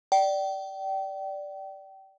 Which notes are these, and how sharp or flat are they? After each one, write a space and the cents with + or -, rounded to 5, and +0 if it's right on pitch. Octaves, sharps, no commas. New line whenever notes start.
D5 +0 G5 -30